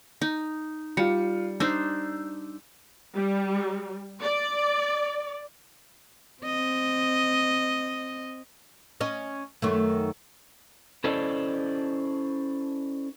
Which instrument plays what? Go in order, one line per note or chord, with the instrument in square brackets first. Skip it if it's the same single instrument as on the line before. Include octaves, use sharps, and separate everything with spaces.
[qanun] D#4
[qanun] G3 [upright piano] F4 C#7
[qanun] D4 D#4 C5 [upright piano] E6
[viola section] G3
D5
[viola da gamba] C4 D#5
[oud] C#4 D#5
F#2 D#3 A3
[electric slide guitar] C#4 E4 A4 C5 D5 D#5